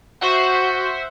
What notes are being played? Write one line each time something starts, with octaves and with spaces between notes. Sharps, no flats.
F#4 C5 E5 F#5